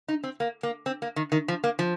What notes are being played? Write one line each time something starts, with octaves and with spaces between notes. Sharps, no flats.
D#4
C4
A#3
A#3
C4
A#3
D#3
D#3
F3
A#3
F3